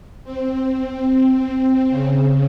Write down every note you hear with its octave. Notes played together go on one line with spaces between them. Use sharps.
C4
C#3